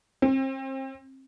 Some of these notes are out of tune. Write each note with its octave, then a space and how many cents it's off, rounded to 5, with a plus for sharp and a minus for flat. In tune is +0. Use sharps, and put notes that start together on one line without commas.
C4 +30